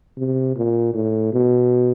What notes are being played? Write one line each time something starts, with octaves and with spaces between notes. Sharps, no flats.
C3
A#2
A2
B2